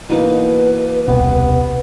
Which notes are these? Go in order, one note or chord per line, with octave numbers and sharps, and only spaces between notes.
B2 E3 A#3 D#4 B4
D#1 C2 B2 B3